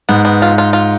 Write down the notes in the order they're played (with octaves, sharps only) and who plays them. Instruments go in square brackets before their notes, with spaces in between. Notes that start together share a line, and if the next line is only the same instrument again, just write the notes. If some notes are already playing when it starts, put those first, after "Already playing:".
[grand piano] G#2 [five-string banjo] B3
[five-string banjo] B3
F4
F4
F4